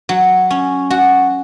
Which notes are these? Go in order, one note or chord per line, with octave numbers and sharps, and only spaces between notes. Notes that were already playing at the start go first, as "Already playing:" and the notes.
F#3
C#4
F#4